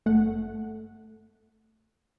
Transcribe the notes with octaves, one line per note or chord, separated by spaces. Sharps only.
G1 A3 F#5